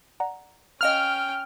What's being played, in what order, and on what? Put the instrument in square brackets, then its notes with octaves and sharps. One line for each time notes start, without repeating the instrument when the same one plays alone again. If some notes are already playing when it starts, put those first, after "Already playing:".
[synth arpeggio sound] D5 F#5 A#5
[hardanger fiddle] C#4 G5 [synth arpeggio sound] D#5 F5 A#5 [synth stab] F6